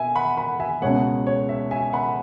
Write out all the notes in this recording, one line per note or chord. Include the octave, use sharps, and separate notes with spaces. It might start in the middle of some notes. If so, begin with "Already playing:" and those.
Already playing: B2 E5 G#5
F#5 B5
F#5 B5
E5 G#5
C#2 B2 G#3 C#5 F#5
C#5
E5
E5 G#5
F#5 B5